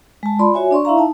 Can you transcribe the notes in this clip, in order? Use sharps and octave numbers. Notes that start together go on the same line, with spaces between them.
G#3 A5
F4 D5 B5 C6
F#4 C#5 E5 G#5
D4 D5 C6 C#6
E4 E5 F5 A#5
D#4 A5